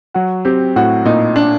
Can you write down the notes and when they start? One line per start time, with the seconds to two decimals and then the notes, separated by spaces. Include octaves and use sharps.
0.14 F#3 F#4
0.45 C4 G4
0.76 A2 F#4
1.05 A#2 D#4
1.36 D4